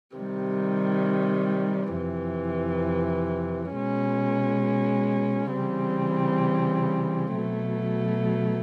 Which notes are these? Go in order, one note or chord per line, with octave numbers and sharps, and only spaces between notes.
C3 D#3 G3
F2 C3 E3
B2 G#3 C#4
C#3 E3 G3 C4
B2 F#3 A3